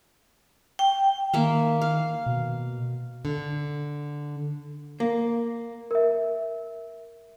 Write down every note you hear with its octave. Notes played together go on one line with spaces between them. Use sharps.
G5
D#3 A#3 E5 F5
F5
B2
D3
A#3
A#4 E5